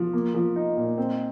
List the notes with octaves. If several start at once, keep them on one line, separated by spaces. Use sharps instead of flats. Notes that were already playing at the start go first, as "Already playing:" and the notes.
Already playing: F3
A#3
F3
D#4
A#2
C4